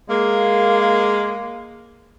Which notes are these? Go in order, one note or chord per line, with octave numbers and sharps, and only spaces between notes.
G#3 A#3